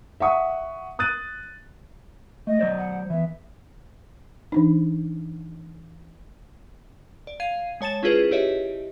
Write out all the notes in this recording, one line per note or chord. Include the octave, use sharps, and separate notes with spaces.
E5 F#5 C#6 D#6
D#6 F#6 A6 D#7
A3 D#5
F#3 C5 D5
F#5
E3 B3 E5
E3 D4 D#4
D5
F5 G#6 C7 D#7
G#3 C#5 A5 A6 E7
C#4 E4 F4 G#4 B4 C5
E4 G4 C#5 D#5 E5